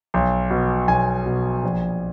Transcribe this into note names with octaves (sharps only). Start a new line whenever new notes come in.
B1
B2
B1 G#5
B2
A#1